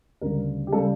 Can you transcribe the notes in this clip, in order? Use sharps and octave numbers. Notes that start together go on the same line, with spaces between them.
D2 C#3 G3 A#4
G4
C#3 G3 A4